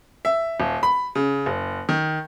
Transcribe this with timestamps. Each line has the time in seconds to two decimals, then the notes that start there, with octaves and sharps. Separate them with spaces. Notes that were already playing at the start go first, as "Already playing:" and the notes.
0.25 E5
0.60 D#1
0.83 B5
1.15 C#3
1.46 F#1
1.89 D#3